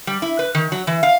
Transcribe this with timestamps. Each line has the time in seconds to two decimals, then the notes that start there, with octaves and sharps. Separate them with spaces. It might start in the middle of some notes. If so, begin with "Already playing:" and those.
0.07 G3
0.22 E4
0.39 B4
0.55 D#3
0.72 F#3
0.87 E3
1.03 F5